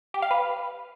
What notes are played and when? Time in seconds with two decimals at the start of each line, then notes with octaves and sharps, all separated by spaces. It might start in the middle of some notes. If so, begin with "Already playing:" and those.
0.14 G4
0.22 F5
0.31 B4